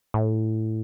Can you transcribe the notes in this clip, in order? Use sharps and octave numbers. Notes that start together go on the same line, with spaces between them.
A2